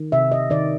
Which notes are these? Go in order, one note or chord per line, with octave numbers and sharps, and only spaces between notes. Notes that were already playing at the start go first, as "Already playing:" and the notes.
Already playing: D#3
C3 E5
D#5
D#3 D5